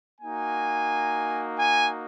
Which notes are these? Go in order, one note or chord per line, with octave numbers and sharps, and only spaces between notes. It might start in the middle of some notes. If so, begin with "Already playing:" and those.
A#3 D#4 F#4 G#5
G#5